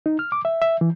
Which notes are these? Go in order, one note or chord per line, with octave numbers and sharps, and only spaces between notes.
D#4
F6
D6
E5
E5
E3